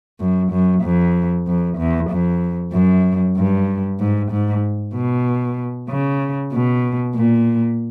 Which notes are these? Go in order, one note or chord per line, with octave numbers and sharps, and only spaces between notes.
F#2
F#2
F2
F2
E2
F2
F#2
G2
G#2
G#2
B2
C#3
B2
A#2